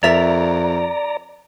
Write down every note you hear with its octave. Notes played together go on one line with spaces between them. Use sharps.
F2 A#4 D5 E5 A#5